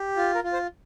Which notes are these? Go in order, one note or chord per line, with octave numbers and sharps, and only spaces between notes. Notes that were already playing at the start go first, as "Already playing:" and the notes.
Already playing: G4
F4
A#4
F4
C5